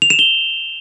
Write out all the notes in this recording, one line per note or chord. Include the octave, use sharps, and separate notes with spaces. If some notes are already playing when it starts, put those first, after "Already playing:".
F7
E7
G7